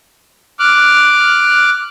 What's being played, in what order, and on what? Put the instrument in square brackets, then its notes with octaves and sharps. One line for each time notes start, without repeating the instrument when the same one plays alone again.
[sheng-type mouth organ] D6 F6 F#6